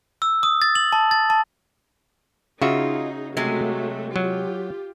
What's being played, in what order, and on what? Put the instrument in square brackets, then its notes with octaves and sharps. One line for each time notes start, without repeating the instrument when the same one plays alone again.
[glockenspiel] E6
D#6
A6
F#7
A5
A6
A5
[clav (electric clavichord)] C#3 F#4 E5 [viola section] D#4 G#4 [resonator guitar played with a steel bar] F4
[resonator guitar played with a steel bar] C3 G#3 [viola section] F#3 A3
[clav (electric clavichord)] F#3 [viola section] F4 G4